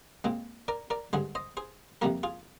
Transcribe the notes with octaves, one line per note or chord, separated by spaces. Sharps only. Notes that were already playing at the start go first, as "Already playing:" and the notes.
A#2 G#3 C4
A#4 D5
A#4 D5
G2 D3 G#3 G#4 C5
C5 D#5
G#4 C5
F2 C3 G3 A#3 G4 A#4
F4 G#4